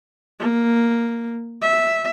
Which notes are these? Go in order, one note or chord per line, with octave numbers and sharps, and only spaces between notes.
A#3
E5